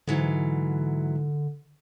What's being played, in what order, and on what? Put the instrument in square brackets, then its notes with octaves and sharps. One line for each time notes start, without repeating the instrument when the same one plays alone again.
[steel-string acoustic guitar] G#2 E3 F#3 [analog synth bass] D3